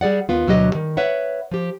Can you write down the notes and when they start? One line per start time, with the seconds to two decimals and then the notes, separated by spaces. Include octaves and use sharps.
0.01 G3 G#4 D5 F#5
0.29 D#2 B3 F4
0.47 D2 B2 F#3 G4 D#5
0.75 D#3
0.97 B4 C#5 E5 F#5
1.51 F3 G4